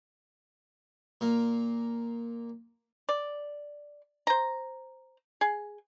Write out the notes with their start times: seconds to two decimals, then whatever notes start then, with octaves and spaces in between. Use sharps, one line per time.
1.21 A#2 A#3
3.09 D5
4.27 C5 A#5
5.41 G#4